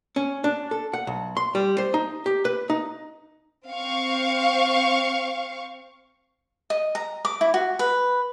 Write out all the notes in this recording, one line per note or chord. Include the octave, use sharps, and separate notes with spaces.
C#4
D4
A4
F#5
B1
C6
G3
C5
D#4
G4
B4
D#4
C4 F5 C#6
D#5
A#5
D6
E4
F#4
B4